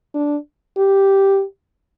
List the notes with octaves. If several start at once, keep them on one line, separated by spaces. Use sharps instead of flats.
D4
G4